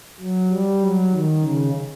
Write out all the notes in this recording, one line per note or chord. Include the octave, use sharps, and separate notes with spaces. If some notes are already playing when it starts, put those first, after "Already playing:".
F#3
G3
F#3
D#3
C#3